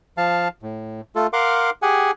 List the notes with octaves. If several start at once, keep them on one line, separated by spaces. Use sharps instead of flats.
F3 F5 A5
A2
A3 F4 A4
A#4 F5 F#5 C6 D6
G4 G#4 F#5 G#5